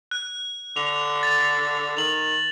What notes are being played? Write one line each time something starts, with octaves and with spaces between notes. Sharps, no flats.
F#6
D3 F7
A6
D#3 F7 F#7